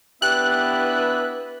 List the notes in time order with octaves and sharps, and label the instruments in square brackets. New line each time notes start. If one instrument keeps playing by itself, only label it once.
[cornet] B3 [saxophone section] D4 E4 B4 [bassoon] G4 [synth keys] F#6